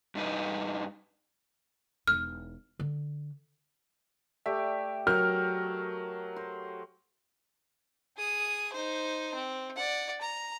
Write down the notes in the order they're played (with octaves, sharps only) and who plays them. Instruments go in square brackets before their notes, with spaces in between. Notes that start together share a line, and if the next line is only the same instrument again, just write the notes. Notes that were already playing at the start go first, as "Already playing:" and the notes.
[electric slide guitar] G2 D4 D#4 B4
[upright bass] E1 D#4 [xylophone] F6
[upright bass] D3
[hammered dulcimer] A3 G4 D5 [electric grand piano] E5 B6
[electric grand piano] F#3 A#4 G6 [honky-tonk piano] F6
[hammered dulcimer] C5
[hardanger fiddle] G#4 D#6
D#4 C5
C4
D5 F#5
A#5